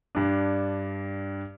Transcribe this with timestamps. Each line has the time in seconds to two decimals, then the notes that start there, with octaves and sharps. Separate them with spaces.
0.15 G2 D4